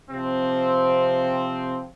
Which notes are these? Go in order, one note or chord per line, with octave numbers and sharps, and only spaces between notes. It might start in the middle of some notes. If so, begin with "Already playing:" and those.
C3 F3 C4